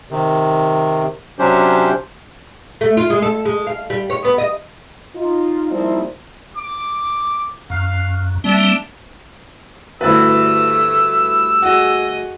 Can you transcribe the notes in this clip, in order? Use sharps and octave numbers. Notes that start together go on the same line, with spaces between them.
C3 D#3
C3 F#3 C#4 D4 G4 C5
A3
F4
G#3
A4
G#3
F5
G3
C#5
B3
D#5
D#4 F4
F3 G3 A#3 C4 D#4 E4
D6
F#2 F5
G3 A#3 C4 D4 E5 A5
D2 G2 A3 C4 E4 B4 E6
F#4 G#4 D#5 F#5